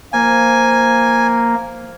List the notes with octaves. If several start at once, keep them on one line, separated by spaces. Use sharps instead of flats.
F3 A#3 G#5